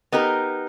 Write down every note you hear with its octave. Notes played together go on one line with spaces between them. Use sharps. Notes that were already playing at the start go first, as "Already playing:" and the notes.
B3 D#4 G4 A#4